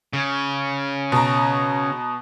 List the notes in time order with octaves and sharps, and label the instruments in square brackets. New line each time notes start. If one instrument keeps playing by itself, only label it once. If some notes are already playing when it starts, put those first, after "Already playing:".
[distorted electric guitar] C#3
[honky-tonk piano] B2 A#5